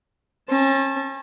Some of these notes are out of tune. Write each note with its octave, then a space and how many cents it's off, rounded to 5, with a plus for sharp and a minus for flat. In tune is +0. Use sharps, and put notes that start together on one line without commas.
C#4 -35 A5 -10